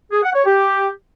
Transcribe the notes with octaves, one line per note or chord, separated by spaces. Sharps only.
G#4
F#5
C#5
G4